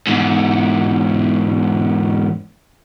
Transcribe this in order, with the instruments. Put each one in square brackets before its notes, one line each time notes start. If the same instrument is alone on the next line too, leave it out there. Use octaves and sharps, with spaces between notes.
[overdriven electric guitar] E2 G#2